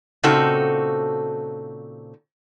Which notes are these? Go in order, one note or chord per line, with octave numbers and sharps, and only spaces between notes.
A#2 C#3 C4 D#4 F#4 A4